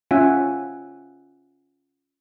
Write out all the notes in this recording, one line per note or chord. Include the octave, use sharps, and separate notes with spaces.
C#4 F4 E5 F#5 G#5